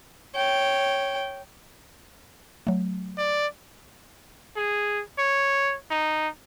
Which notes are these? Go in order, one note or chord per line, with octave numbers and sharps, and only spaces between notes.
C#5 G5
F#3 A3
D5
G#4
C#5
D#4